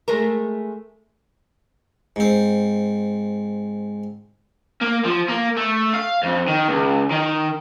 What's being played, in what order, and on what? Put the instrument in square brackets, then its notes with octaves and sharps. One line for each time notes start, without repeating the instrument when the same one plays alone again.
[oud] G#3 A3 A#4
[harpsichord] G#2 C4
[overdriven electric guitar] A#3
F3
A#3
A3
F5
F2
D#3
C#2
D#3